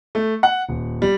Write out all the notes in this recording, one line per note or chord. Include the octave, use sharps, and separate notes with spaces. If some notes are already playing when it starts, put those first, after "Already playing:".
A3
F#5
D#1
G3